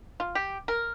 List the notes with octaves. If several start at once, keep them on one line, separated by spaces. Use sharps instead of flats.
F4
G4
A#4